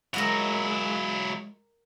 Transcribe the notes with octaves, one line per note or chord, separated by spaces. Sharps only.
F#3 G#3 E4 A#4 D#5 F#5